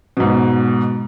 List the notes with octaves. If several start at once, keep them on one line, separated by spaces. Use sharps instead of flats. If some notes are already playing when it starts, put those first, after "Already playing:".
G#2 B2